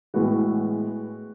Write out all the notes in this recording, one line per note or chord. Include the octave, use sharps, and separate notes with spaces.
A2 E3 G#3 B3 F#4